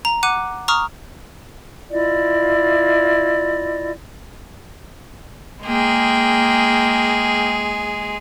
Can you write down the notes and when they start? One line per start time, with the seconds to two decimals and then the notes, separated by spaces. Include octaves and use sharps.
0.05 A#5
0.23 F#5 D6 F#6 D#7
0.68 A#5 C#6 D#6 F6
1.89 E4 F4 D5 D#5
5.65 G#3 A#3 G#4 G5